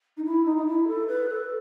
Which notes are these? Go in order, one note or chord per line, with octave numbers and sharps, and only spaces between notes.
D#4
E4
D#4
D#4
E4
A4
B4
A4